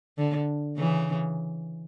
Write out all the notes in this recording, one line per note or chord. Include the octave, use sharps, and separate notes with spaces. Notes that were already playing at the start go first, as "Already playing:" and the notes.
D3
C#3 E3